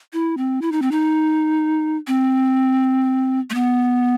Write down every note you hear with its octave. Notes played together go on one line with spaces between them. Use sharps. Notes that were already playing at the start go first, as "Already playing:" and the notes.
E4
C4
E4
D#4
C4
D#4
C4
A3
B3